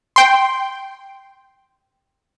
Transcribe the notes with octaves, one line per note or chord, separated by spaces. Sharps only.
G5 C6